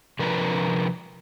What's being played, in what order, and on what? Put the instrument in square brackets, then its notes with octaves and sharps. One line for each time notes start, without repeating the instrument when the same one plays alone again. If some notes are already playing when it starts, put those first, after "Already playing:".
[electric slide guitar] C3 F3 D4 A#4 B4